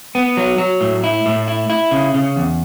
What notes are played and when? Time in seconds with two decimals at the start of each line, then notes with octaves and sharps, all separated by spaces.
0.15 B3
0.37 F#3
0.58 F#3
0.81 A2
1.04 E4
1.26 A2
1.48 E4
1.70 E4
1.91 C#3
2.14 C#3
2.36 E2